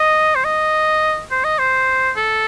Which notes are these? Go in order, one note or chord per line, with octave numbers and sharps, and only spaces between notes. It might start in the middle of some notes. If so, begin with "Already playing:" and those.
Already playing: D#5
C5
D#5
C5
D#5
C5
A4